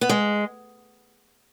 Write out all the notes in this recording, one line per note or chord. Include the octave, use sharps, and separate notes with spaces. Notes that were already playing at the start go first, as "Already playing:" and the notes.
B3
G#3